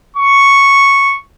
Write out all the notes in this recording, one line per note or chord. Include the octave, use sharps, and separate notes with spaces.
C#6